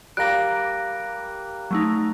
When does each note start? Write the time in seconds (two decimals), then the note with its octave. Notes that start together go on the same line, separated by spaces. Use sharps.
0.17 G3 A#3 F#6 A#6 D7
1.71 F#3 A3 D#4